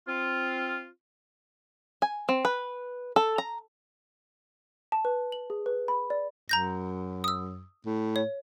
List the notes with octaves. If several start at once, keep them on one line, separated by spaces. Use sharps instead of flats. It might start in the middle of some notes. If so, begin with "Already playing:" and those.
C4 F4
G#5
C4
B4
A4
A#5
A5
B4
F#7
G#4
B4
B5
D5
F#2 A#5 G6 A#6
D#6 E6
A2
C#5